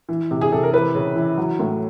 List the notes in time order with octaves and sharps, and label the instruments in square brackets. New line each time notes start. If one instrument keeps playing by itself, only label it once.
[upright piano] E3
C3
G#4
C3 A4
A#4
E3 B4
C#3
E3
F#3
A2